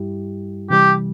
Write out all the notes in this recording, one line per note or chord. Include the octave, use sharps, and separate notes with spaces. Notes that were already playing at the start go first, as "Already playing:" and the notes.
Already playing: G2 G3 E4 G4
C3 E3 G3 G4